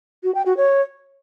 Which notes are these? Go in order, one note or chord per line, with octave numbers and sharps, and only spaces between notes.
F#4
G5
F#4
C#5